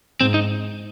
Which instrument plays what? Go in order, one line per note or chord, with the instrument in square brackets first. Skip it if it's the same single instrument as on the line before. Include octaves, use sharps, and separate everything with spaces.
[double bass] G#2 [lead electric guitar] C4
[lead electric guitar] D#4